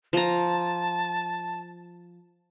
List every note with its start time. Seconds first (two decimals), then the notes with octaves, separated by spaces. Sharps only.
0.13 F3 A5 A#5